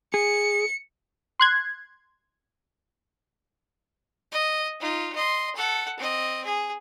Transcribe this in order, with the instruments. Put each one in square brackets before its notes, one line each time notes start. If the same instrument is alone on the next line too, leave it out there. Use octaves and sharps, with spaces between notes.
[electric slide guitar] G#4 [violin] C#7
[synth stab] C6 F#6 G#6
[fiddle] D#5
D#4 F4
D#5 C6
A4 F#5
C4 D#5
G#4